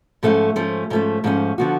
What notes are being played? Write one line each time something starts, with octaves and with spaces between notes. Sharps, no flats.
G#2 F3 A3 C#4
G#2 F3 A3 C#4
G#2 F3 A3 C#4
G#2 F3 A3 C#4
D3 F3 B3 F#4